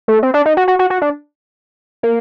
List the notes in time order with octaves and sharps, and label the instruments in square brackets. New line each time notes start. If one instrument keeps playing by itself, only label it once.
[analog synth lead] A3
C4
D4
D#4
F#4
F#4
F#4
F#4
D4
A#3